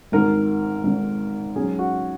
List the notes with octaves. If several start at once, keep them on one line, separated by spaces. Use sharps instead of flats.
G#1 G#2 D#3 A#4
G#1 G#2 D#3
G#2 F#3 C#4 G#4
F#4